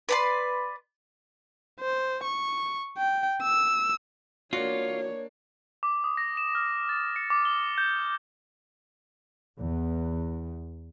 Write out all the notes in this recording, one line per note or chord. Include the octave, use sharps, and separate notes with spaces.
B4 D5 C6
C5
C#6
G5
E6
A#3 D4 F4 F#4 C#5
D6
D#6
A#6
E7
F6
A6
C#7
D6
G7
G6
E2